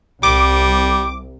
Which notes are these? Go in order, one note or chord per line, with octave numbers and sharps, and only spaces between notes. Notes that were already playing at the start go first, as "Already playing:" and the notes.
C2 G3 D6